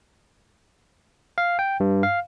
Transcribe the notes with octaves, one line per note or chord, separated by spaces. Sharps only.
F5
G5
G2
F5